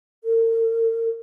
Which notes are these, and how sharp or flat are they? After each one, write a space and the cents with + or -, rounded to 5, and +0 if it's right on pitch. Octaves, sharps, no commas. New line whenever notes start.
A#4 -40